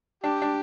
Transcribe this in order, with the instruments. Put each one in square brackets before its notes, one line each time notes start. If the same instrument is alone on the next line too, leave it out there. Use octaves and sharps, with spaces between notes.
[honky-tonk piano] D4 [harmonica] G4
[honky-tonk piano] D4